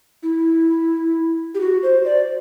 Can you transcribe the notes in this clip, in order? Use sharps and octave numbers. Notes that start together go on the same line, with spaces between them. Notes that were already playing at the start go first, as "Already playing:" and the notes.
E4
G4
F#4
C5
D5